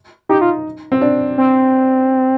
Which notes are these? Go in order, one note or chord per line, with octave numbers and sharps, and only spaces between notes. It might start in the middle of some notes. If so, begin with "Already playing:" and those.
D#4 G4
F4
C4
D4
C4